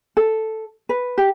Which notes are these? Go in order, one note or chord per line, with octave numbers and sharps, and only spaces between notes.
A4
B4
G4